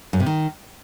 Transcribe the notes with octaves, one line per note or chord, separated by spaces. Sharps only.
F#2
C3
D#3